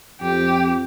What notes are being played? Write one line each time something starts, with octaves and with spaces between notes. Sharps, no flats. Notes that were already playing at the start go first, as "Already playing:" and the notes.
F2 G4